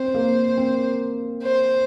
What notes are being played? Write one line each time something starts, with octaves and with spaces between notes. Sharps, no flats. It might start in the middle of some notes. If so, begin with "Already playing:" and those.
Already playing: C4 C5
A#3
C4
C5